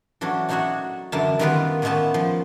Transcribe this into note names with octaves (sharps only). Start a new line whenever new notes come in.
E3 F#3 A3 C#4 D4
D4 D#4 F#4 C#5 E5 F#5
F#2 D3 E3 E4 A#4 A5
D#3 G3 B3 F4 A#4 B4
A#2 D#3 A3 B3 C#4 A5
F3